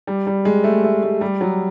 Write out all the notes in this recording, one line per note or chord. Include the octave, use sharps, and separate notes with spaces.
G3
G3
G#3
A3
A3
G#3
G3
F#3